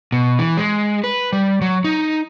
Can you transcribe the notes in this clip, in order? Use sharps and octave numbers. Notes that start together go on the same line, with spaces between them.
B2
E3
G#3
B4
G3
F#3
D#4